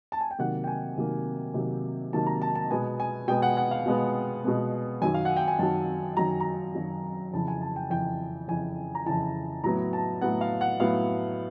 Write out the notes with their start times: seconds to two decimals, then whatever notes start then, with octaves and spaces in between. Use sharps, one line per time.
0.12 A5
0.21 G#5
0.31 G5
0.38 C3 D#3 F#3 A#3 F#5
0.64 G5
0.67 G#5
0.97 C3 D#3 F#3 A#3
1.54 C3 D#3 F#3 A#3
2.13 C3 D#3 F#3 A#3 A5
2.26 A#5
2.42 A5
2.55 A5
2.70 B2 G#3 B3 G#5
3.00 G#5
3.28 B2 G#3 B3 G5
3.42 F#5
3.57 F#5
3.71 F5
3.86 B2 G#3 B3
4.44 B2 G#3 B3
5.02 F#2 D#3 F#3 G#5
5.14 F5
5.25 F#5
5.37 G5
5.48 G#5
5.59 F#2 D#3 F#3 A5
6.17 F#2 D#3 F#3 A#5
6.40 A#5
6.75 F#2 D#3 F#3
7.33 F2 C#3 E3 A5
7.48 G#5
7.61 A5
7.76 G5
7.90 F2 C#3 E3 G5
8.48 F2 C#3 E3 G#5
8.95 A#5
9.06 F2 C#3 E3 A5
9.64 A2 F#3 B3 A#5
9.93 A5
10.21 A2 F#3 B3 F#5
10.41 F5
10.61 F#5
10.80 A2 F#3 B3 F5